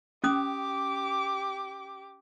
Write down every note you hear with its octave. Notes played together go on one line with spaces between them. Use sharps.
C#4 G4 D6 D#6